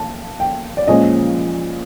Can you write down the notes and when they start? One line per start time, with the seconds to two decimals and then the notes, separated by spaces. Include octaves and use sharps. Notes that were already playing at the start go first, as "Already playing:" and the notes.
Already playing: A5
0.40 G5
0.77 D5
0.87 A#2 F3 G#3 C#4 D#5